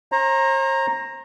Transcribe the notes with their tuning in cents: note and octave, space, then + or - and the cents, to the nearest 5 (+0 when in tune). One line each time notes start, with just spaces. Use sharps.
C5 +45 A#5 +0